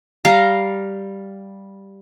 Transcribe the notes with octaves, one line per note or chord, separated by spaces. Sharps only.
G3 F5 A#5